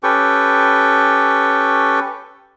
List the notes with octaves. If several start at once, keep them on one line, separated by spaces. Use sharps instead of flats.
C#4 G4 A4 B4 G5 C#6